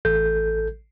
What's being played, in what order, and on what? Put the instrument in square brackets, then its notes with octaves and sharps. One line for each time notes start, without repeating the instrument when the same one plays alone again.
[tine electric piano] A1 A4 G6